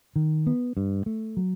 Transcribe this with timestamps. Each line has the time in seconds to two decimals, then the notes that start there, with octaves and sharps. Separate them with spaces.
0.16 D#3
0.47 B3
0.77 G2
1.06 A3
1.37 F#3